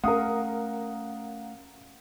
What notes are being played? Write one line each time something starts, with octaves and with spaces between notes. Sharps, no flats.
A3 C#4 A#4 F5 F#5 D#6